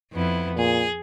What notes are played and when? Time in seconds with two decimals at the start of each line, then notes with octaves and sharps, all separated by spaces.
0.12 F2 B3 E4
0.56 A#2 G#4